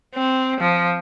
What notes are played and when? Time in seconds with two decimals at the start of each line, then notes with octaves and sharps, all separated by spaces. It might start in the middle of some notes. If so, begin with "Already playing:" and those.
0.15 C4
0.61 F3